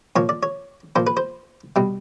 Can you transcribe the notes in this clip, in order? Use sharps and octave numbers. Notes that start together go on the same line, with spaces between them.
A#2 F3 C#5
D5
C#5
A#2 F3 C5
B4
C5
B2 G3